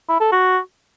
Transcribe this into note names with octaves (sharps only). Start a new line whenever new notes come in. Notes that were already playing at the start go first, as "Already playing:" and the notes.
E4
A4
F#4